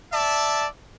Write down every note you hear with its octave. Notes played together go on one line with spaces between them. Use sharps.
D5 E5 A5